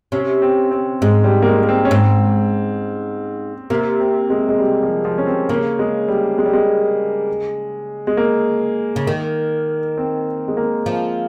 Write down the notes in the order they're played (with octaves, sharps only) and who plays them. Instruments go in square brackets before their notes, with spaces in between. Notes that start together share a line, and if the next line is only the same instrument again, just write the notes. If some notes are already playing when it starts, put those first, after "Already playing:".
[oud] C3 [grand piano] C#4
[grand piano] C4
C4
[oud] G#2 [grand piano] G#3
[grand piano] G3
A#3
G#3
A#3
C4
C#4
[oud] G#2 [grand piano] C4
[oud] C3 [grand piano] A#3
[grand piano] C4
G#3
G#3
G3
F3
F3
C#4
C4
[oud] C#3 [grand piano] A#3
[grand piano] G#3
G3
G#3
G3
G#3
G#3
A#3
[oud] C#3
D#3
[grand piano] C4
G#3
A#3
[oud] F3